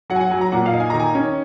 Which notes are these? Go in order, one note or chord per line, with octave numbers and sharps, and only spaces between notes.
F#3 F#5
G#5
F#5
F#3 G#5
A#5
A#2 F#5
F5
D#4
G#5
D#3 A#5
G#5
C#4